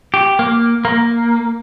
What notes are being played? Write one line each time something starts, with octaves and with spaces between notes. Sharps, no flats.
G4
A#3
A#3